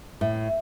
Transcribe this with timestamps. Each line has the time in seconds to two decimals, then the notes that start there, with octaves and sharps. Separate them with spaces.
0.21 A2